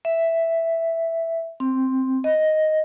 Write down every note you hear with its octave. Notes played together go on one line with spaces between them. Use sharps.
E5
C4
D#5